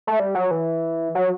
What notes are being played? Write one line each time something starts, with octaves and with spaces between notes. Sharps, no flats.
A3
G3
F#3
E3
F#3